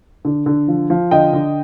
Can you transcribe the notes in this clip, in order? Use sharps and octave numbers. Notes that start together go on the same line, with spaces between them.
D3
D3
F3
F3
D3 D#5 G5
D3